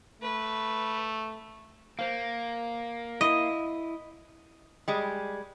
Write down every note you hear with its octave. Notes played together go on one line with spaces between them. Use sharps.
A3 B4
A#3 C5 F5
E4 D#5
G3 G#3